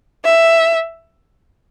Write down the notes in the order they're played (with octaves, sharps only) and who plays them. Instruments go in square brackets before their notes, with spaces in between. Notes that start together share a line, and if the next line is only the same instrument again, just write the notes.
[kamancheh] E5